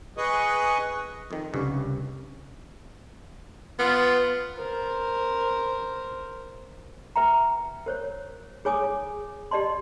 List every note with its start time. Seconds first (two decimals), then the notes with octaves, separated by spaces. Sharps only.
0.18 G#4 B4 D#5 C#6 D#6
1.31 F2 D#3
1.54 C2 G2 C#3
3.79 B3 F4
4.56 A#4 C5
7.16 B4 E5 G5 A#5
7.86 A#4 C5 C#5
8.65 G#4 C#5 G#5 D6 D#6
9.51 G4 D5 D#5 A5 C6